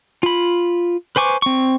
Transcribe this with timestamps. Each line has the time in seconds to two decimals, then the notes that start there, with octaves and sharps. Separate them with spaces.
0.23 F4 B5
1.16 B4 C5 G#5 C#6 D6
1.42 C4 C#6